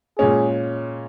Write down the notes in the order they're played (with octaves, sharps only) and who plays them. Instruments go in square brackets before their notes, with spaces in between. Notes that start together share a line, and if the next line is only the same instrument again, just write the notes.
[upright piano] A#2 G#3 C#4 [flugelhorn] G#4